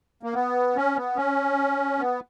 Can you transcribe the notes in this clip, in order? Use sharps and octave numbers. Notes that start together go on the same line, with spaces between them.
A#3
B3
C#4
B3
C#4
B3